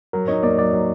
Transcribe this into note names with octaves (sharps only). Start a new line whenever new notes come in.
F#3 A#4
D#4 C#5
A#3 D5
F#3 D5
F#3